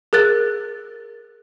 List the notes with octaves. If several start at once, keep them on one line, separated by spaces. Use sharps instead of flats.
G#4 A#4 F#6 A6